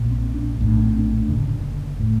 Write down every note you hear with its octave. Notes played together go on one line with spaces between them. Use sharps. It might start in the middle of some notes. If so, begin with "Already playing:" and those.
Already playing: A#1 A#2
C4
D4
A#1 A2
D4
C4
D4
F#1 F#2 D3
A2